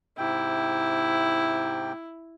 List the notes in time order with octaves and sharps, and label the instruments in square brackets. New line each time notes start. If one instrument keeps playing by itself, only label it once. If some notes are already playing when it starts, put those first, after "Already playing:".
[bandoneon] G#2 C3 G5 [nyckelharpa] E4